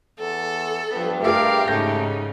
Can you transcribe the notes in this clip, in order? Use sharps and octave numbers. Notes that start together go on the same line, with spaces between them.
E2 A4
G2 F3 B3
A3 F4 G4 G#4 A#4 F5 D6
G#2 C#3 A3 D#4 G6 A#6